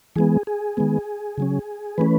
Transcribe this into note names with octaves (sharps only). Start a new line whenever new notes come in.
E3 G#3 B3 G#4
G#4
D#3 G#3 B3
C#3 F#3 C#4
E3 A3 C#4 B4